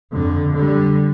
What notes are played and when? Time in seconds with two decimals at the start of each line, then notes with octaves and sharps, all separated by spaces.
0.12 F2 D3
0.53 D3 G3